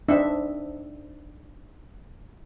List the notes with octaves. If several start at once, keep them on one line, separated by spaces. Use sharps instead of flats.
C4 D4 D#4 B4 D#5 E5